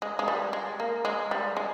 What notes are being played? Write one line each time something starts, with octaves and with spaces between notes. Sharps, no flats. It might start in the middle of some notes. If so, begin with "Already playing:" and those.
G#3
G#3
G3
G#3
A#3
G#3
G3
G#3